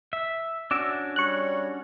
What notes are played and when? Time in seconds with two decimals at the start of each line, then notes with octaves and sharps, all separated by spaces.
0.13 E5
0.71 C#4 D4 F#4 D6 E6
1.16 G3 C#5 C#6 F#6